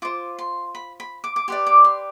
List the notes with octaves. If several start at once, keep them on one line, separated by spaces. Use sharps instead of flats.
F4 C5 D6
C6
B5
B5
D6
D6
G4 B4 D5 C6
D6
C6